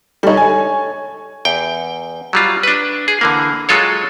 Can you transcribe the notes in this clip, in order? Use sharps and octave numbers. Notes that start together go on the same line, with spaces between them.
G3 D#4 A4 C#5
G#5
E2 G5
F#3 G3 F4
D4 B4
G#4
D3 E3 A#3
F#3 G#3 F4 A4 C#5